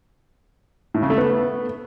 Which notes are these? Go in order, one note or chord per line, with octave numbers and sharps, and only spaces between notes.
A2
C#3
A3
B3